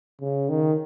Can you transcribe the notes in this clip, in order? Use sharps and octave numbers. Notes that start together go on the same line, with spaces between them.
C#3
D#3